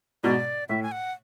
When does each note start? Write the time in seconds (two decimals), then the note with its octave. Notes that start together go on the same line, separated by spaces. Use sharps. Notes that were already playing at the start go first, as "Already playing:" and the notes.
0.24 G#2 B2 D5
0.69 A2 E5
0.83 G#5
0.92 F#5